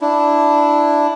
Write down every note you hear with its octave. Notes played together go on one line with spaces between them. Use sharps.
D4 E4